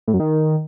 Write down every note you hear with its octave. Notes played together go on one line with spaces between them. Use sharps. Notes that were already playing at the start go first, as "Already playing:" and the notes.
A2
F#2
D#3